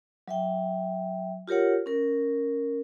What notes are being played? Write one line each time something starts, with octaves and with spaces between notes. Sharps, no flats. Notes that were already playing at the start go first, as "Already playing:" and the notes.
F#3 E5 G5
F4 G4 A#4 C#5 F#5
C#4 A#4